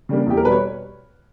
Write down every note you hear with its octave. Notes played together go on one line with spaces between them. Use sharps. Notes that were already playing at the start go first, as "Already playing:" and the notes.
C#3 G3 A#3 D4
E2 G4
A#4
B2 G3 B4
C#5